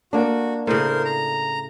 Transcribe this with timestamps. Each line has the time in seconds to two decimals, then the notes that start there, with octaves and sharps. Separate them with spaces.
0.13 A#3 D4 F#4
0.67 A2 C#3 A#4 C5
1.05 A#5